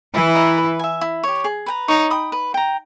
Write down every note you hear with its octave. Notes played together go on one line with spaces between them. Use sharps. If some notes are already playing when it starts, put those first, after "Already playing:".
E3 E4 B4
D#5 A#5
B4
E5 G#5
E4
G4 C#5
G#4
B4 G5 A#5
D#4 C#5
G5 B5 D#6
B4
G5 A#5